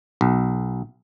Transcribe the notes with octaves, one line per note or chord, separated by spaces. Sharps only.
B1